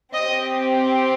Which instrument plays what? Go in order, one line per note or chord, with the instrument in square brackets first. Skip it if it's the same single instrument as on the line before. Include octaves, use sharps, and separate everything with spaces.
[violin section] C4 G4 D#5